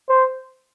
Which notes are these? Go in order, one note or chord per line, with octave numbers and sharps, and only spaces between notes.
C5